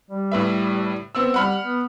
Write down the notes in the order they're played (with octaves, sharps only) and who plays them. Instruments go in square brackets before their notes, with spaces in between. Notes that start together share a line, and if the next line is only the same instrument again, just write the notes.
[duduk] G3
[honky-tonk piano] A2 B4 E5
B3 C4 E6
[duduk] G3 [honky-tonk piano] F#5 B5 F6
[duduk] B3